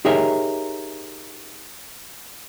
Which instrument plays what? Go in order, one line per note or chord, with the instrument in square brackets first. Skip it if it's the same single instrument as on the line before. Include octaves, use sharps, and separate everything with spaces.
[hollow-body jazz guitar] D#4 G4 G#4 A#4 C#5 E5